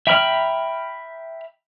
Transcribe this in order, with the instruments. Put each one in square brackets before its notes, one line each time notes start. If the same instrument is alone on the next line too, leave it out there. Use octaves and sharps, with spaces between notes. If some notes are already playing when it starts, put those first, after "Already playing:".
[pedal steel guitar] E5 G5 A#5 B5 F6